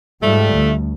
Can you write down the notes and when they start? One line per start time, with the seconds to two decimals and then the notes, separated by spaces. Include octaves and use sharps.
0.22 G#2 F3 G3 A3
0.54 D2